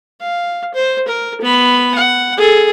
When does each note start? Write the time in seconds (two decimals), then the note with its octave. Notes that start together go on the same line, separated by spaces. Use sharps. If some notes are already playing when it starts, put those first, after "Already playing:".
0.20 F5
0.74 C5
1.07 A#4
1.41 B3 B5
1.95 F#5
2.37 G#4 A4